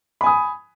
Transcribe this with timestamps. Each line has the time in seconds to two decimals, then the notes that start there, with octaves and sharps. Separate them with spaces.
0.21 B5
0.24 G#5
0.26 D#6